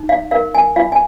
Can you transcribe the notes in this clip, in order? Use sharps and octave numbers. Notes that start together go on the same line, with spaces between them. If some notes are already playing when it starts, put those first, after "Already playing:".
Already playing: D#4
F5
A#4 F5
G#5
F4 F5
G#5